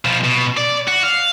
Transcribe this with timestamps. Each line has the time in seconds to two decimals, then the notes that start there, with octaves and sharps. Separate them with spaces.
0.05 B2 F3
0.24 B2
0.57 D5
0.88 F#4
1.03 F5